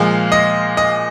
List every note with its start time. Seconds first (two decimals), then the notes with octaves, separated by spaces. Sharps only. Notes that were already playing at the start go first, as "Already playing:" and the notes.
Already playing: A#2 F3 G#3 F5
0.32 D#5
0.77 D#5